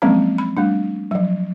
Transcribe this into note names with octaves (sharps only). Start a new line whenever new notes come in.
F3 F#3 G#3 A#3 C4 C#4
B5
G3 A3 D4
F3 F#3